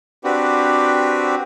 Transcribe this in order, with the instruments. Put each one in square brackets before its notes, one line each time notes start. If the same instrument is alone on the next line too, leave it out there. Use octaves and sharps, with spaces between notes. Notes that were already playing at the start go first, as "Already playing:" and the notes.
[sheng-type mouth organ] C4 D4 F#4 G4 B4